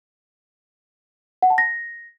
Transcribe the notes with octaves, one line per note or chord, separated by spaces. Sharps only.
F#5
A5
A#6